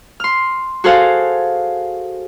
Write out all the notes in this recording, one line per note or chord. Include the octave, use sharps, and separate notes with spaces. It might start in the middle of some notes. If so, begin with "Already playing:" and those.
C6 F6
F#4 G#4 A4 C5 F5 F#5